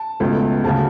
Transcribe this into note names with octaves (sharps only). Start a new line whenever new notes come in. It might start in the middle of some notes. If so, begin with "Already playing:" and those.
Already playing: A5
C#2 B2 A3
D2 C#3 F#3 A5